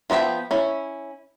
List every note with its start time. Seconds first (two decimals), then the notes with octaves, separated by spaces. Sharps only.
0.10 F3 B3 F4 E5 G5
0.51 C#4 E4